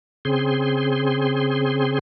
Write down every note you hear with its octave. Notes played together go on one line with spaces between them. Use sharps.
C#3 C4 G#4 C6